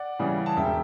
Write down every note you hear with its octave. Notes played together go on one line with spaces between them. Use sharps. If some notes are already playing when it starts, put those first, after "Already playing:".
Already playing: D5 F#5
C#3 E3 G3
A5
E1 E5 G5